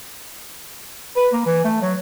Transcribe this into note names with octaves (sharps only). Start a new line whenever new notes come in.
B4
A#3
E3
A3
F#3